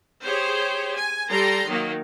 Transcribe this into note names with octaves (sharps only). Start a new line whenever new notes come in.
G4 G#4 C5 C#5
G#5
G3 A4 A#5 C6
D#3 F#3 A#3